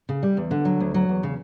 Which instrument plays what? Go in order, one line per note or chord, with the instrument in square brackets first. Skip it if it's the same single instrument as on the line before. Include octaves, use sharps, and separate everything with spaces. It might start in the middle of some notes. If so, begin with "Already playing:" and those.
[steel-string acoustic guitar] C#3
G3
E2
D3
F#3
D2
F#3
E2
C#3